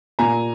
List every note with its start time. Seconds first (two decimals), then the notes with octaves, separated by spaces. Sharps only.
0.19 A#2 G#5 A#5